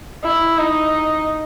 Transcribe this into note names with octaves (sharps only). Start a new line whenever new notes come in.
E4
D#4